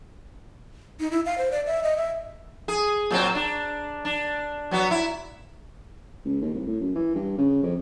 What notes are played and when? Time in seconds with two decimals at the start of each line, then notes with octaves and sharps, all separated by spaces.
1.00 D#4
1.11 E4
1.26 F5
1.38 C5
1.51 D5
1.66 E5
1.83 D#5
1.97 E5
2.68 G#4
3.11 A#2 F#3 C4
3.35 D4
4.05 D4
4.71 F#3 B3 F#4
4.91 E4
6.25 C#2
6.41 D#2
6.54 C2
6.67 A2
6.80 F#2
6.95 E3
7.15 G2
7.38 C#3
7.63 F2